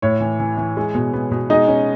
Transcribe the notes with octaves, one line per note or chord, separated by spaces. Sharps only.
A2 C#5
E3
E3
E3
G#3
B2
B3
B2
G#3 D#4 D#5
C#4